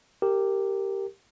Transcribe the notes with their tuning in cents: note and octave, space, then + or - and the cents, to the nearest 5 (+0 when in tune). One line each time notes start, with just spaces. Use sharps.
G4 +0 A#4 -15